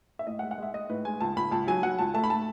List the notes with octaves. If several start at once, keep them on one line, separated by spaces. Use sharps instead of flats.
E5
A2 D#5
F#5
G#3
F#5
G#3 E5
G#3 D#5
A2 B4
G#3 G#5
C#2 A5
C#2 B5
C#2 A5
F#3 G#5
F#3 F#5
C#2 A5
A3 A5
B5
A3 A5